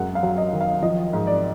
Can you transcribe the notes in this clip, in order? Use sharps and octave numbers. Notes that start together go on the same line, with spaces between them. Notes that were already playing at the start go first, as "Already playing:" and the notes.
Already playing: F#2 G#3 F#5
F5
F#3
D#5
D#3
F5
F3 D#5
G#2
D5